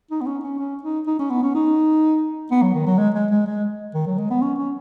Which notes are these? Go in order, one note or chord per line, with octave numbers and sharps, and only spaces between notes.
D#4
B3
C#4
C#4
C#4
D#4
D#4
C#4
B3
C#4
D#4
B3
F#3
D#3
F#3
G#3
G#3
G#3
G#3
D#3
F#3
G#3
B3
C#4
C#4